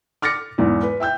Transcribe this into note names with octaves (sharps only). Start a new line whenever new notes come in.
D6 F6 A6 A#6 C#7
E2 G#2
B4
E5 G5 E6 G6